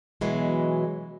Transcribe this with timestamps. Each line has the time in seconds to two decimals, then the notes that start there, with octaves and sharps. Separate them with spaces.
0.21 B2 E3 F#3 G#3